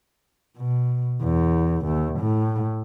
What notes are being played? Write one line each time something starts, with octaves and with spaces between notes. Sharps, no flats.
B2
E2
D#2
A2